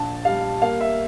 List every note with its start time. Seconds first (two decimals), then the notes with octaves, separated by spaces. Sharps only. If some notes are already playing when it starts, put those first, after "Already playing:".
Already playing: A#1 A5
0.25 G3 F5
0.62 A#3 F5
0.81 E5